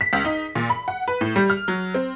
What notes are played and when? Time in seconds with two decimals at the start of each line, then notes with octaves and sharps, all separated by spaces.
0.01 B6
0.13 C#2
0.25 D#4
0.55 A#2
0.70 B5
0.88 F#5
1.08 B4
1.21 A2
1.36 G3
1.50 F6
1.68 F#3
1.95 C4